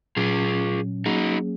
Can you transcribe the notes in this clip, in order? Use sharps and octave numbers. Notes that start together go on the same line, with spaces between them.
A#2 F#3 C#4 F4 G#4
F#3 A#3 C#4 D#4 F#4 G#4